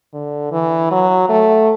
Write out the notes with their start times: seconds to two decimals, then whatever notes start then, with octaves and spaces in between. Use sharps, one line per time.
0.13 D3
0.52 E3
0.91 F#3
1.29 A3